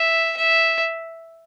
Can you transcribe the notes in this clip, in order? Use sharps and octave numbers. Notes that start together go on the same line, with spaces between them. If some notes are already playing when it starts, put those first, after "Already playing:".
Already playing: E5
E5